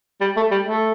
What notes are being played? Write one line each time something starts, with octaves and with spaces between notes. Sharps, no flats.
G3
A3
G3
A3